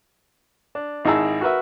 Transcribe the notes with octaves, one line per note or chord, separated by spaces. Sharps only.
D4
G#1 D#4 E4 G#4 A5 E6
F#4 A#4 B4 E5